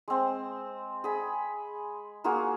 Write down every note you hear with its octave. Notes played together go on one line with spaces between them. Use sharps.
G#3 C4
G#4 B5
A#3 F4 F#4 G#4